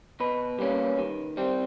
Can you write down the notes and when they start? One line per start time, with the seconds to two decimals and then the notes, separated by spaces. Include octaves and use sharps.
0.20 B2 B4
0.59 G3 A#3 C#4
0.98 D#3
1.37 G3 C4